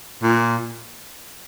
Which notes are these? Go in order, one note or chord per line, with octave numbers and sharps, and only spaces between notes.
A#2